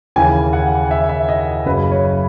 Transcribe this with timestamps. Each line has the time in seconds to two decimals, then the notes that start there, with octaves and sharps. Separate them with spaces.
0.16 D#2 C#3 E3 G#5
0.53 F#5
0.91 E5
1.09 E5
1.29 D#5
1.65 F#1 F#2 C#3 F#3 B4
1.91 C#5